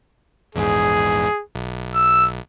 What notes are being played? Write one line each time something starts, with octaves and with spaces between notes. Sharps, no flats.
A#1 E2 G#2 G#4
B1
E6